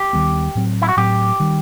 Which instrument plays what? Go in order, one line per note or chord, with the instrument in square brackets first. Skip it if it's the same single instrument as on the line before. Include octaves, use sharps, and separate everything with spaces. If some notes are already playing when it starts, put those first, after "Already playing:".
Already playing: [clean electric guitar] G4
[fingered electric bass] D#2 D#3 G3 B3
A2 F#3 C4
[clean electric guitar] E4
F#4
[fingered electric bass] A2 F#3 C4 [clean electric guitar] G4
[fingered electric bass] D#3 G3